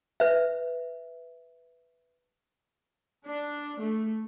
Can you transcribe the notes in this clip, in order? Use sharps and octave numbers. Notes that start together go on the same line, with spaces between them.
B4 E5
D4
A3